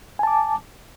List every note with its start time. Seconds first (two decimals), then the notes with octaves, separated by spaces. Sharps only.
0.19 G#5
0.23 A5
0.27 D6